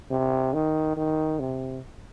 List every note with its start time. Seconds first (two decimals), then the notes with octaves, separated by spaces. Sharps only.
0.10 C3
0.54 D#3
0.97 D#3
1.40 C3